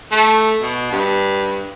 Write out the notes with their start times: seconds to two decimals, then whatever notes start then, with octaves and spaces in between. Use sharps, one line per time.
0.12 A3
0.62 B2
0.92 G2